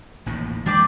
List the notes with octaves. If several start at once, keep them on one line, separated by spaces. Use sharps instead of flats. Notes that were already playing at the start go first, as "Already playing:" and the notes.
A1 D#2 A2
E3 G#3 A#3 D4 G4 D6